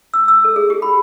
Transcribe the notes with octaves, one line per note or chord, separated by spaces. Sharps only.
E6
E6
A4
G#4
G4
B5